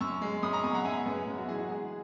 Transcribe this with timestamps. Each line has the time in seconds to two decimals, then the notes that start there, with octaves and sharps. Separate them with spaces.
0.01 F#2 C#6 E6
0.22 G#3
0.43 F#2 B5 D#6
0.53 A#5 C#6
0.64 F#2 G#5 B5
0.74 F#5 A#5
0.85 F#2 E5 G#5
1.06 F#2 G#4 B4
1.27 F#2
1.38 F#4
1.48 E3 G#4
1.59 F#4
1.69 G#3 G#4